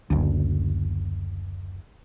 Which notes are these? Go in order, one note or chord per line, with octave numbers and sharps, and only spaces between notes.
F#1 D2